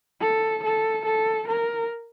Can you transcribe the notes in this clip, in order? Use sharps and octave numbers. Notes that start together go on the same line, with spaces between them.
A4
A4
A4
A#4